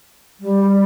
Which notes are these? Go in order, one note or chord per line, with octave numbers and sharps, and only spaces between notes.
G3